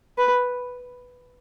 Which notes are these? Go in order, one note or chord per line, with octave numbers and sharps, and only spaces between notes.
B4